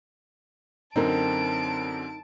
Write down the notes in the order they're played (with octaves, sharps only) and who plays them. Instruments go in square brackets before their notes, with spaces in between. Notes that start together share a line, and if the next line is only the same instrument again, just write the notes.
[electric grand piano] F#2 D3 C4 [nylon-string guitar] D#4 A#4 [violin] A5 D7